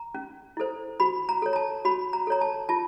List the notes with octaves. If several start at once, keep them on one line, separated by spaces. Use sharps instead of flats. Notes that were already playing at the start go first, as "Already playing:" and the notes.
Already playing: A#5
C#4
E4 A4 C5
F#4 B5
A#5
A4 C#5
A#5
A5
F#4 B5
A#5
A4 C#5 A#5
A5
F4 A5